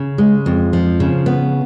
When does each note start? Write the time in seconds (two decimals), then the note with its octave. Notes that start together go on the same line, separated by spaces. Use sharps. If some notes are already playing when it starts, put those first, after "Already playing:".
Already playing: C#3
0.18 G#3
0.46 F2
0.73 F3
1.00 C#3
1.26 B3